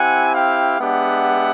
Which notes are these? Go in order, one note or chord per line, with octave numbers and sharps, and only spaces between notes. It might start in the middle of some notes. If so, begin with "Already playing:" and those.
Already playing: C4 E4 G4 F#5 G#5
F5 G5
G#3 B3 D4 G4 E5 F#5